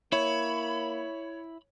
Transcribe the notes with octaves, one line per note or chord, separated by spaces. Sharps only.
A#3 E4 C#5 B5